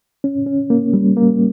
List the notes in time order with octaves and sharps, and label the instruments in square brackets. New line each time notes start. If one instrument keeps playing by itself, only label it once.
[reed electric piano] C#4
C#4
A#3
G3
A#3